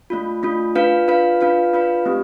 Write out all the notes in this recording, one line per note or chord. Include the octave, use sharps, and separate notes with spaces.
A3 D4 F4
A3 D4 F4
D4 F4 B4 F5
D4 F4 B4 F5
D4 F4 B4 F5
D4 F4 B4 F5
A3 C4 G4